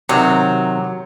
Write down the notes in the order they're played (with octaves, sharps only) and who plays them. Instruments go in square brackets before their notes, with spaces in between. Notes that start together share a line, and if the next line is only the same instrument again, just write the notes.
[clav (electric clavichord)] C3 D#3 C4 [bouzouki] F#3